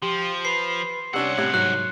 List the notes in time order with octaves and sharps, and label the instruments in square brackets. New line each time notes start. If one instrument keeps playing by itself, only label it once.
[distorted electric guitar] F3 [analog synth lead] G4 [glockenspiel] C6
[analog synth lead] B4 [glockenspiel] C7
[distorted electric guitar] C2 F#5 [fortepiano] C3 C#4 D4 [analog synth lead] E6
[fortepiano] A2 C3 F#6 [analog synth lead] G#6
[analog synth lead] G#2 [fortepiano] F#3 [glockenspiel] F#6